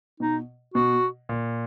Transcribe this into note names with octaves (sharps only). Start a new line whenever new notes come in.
B2 D#4
B2 F#4
A#2